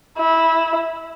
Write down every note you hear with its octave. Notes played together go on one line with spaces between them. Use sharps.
E4